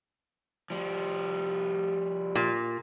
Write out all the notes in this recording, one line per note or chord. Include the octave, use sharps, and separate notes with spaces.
F3 G3
A#2